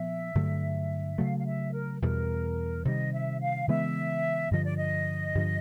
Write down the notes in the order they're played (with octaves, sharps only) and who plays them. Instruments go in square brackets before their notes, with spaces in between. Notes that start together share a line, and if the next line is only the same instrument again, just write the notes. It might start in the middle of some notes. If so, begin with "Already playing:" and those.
Already playing: [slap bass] A#2 F3 B3 [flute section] E5
[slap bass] G2 D3 F#3 A3
[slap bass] C#3 F#3 A3 [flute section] F5
[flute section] F5
E5
A#4
[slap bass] E2 B2 G3 [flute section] A#4
[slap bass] C3 D#3 G3 [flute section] D#5
[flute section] E5
F5
[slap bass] C#3 E3 G#3 B3 [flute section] E5
[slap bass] G2 D3 F3 [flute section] D#5
[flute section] D5
D#5
[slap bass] G2 D3 F3